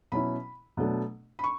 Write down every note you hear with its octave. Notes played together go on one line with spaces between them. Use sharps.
B2 F#3 C#4 E4 B5
B2 F#3 A3 D4
B5
C#6